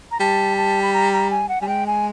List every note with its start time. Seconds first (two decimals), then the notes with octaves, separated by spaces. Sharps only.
0.11 A#5
0.20 G3 A5
0.57 A5
0.82 B5
0.93 A#5
1.13 A#5
1.31 G#5
1.49 F#5
1.62 G3 G#5
1.68 G#3 G5
1.87 G#5